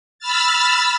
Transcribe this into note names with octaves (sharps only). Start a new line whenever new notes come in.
B5 E6 F6 A6